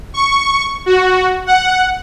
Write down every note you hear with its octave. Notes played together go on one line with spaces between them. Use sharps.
C#6
F#4
F#5